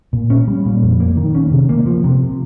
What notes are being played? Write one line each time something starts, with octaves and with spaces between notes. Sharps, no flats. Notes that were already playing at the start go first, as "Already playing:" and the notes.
A#2
C#4
G3
A#2
F2
A#3
D#3
C#4
C3
A#3
F3
C3